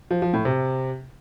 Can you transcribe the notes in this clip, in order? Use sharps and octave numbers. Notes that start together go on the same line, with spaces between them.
F3
F3
A2
C3